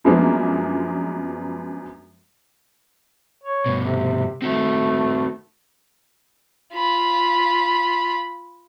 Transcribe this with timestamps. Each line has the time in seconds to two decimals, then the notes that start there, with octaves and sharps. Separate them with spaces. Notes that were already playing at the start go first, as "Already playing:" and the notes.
0.04 F#2 F3 G#3 A#3 B3 D4
3.43 C#5
3.66 G2 B2
3.81 C3
4.42 A3 C4 D#4 F#4
6.74 F4 B5